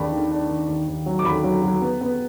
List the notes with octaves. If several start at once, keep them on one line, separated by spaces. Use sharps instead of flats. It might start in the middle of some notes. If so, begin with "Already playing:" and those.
Already playing: D#2 D#3 D4 B5
D#3
D4
D#3
D#2
D#2
F#3
D6
D#2 B5
F#3
F#3
B3
B3